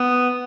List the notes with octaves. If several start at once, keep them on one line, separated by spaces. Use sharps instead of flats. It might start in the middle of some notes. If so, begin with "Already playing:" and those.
Already playing: B3